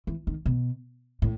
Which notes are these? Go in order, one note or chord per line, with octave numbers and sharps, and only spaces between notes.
E3
D#3
B2
A2